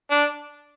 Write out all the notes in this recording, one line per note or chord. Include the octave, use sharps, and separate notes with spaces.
D4